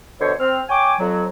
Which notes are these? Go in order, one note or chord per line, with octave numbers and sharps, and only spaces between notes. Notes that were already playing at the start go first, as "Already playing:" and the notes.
B2 D3 C5 C#5
C4 F6
C#5 G5 G#5 D6
F2 F#3